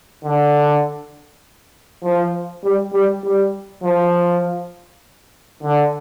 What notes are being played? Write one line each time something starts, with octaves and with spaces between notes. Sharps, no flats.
D3
F3
G3
G3
G3
F3
D3